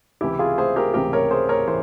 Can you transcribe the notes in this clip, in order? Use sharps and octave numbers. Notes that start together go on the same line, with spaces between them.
C#2 C3 E3 E4 G4
F4 G#4
G#4 C5
G4 A#4
C#2 C3 E3 G4 A#4
A#4 C#5
G#4 C5
A#4 C#5
E3 C5